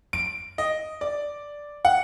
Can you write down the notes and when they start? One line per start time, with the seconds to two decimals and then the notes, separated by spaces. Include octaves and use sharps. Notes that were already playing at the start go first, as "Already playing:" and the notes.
0.13 D7
0.58 D#5
1.01 D5
1.85 F#5